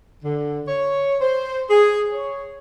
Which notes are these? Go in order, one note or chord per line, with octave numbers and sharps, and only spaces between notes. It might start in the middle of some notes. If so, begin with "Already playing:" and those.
D3
C#5
C5
G#4
C#5